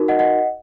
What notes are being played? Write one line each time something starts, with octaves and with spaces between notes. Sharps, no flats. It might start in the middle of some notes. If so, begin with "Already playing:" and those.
Already playing: D#4 F#4 A#4
D#5 F#5
D#5 F#5